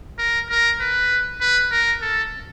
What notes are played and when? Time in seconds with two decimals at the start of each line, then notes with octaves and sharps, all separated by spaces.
0.19 A#4
0.50 A#4
0.80 B4
1.41 B4
1.71 A#4
2.02 A4